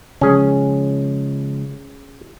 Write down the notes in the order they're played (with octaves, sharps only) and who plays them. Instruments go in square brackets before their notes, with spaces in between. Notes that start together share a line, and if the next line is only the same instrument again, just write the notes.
[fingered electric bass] C#3 F3 G#3 [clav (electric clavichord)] C#4 G#4